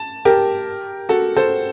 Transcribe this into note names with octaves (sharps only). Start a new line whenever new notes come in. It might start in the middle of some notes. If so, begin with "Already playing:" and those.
Already playing: A5
G4 A#4
F#4 A4
A4 C5